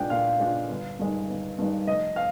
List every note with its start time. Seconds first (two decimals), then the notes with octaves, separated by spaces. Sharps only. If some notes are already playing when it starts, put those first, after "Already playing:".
Already playing: A#2 G#3 D4 F4 G5
0.10 A#2 F5
0.40 G#3 D4 F4
0.69 G1
0.99 G2 D#3 G#3
1.28 G1
1.58 G2 D#3 G#3
1.87 F1 D#5
2.16 F5